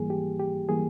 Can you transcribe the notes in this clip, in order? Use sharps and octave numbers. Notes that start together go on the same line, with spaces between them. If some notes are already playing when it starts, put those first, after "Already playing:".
Already playing: G#2 E3 G3 A#3 G#4
G4
G4
E3 G3 A#3 G#4